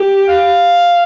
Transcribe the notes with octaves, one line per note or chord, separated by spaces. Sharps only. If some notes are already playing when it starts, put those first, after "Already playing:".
Already playing: G4
F5